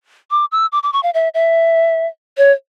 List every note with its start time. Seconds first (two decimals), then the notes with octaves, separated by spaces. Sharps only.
0.31 D6
0.52 E6
0.72 D6
0.83 D6
0.93 C#6
1.03 F5
1.14 E5
1.34 E5
2.37 C#5